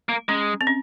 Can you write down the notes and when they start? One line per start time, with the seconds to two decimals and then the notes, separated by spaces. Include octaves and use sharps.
0.09 A#3
0.29 G#3 C#4
0.61 C4
0.67 C#4